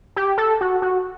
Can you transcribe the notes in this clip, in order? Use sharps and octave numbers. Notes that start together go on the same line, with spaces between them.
G4
A4
F#4
F#4